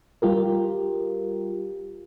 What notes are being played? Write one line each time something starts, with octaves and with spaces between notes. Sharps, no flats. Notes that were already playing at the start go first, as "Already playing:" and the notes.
G3 F4 G4 A#4